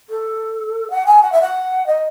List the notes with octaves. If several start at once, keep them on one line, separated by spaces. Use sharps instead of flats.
A4
F#5
G#5
F#5
E5
F#5
D#5